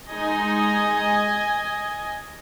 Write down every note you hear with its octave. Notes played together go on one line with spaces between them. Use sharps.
G#3 D#4 D#5 G#5